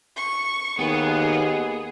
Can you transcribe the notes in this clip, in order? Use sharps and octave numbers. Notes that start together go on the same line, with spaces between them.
C#6
D#2 B3 G#4